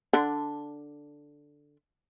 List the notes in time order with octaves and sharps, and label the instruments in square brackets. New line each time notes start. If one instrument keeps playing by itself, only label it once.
[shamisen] D3 D4